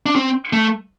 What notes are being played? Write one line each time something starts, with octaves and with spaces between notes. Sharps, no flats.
D4
C4
A3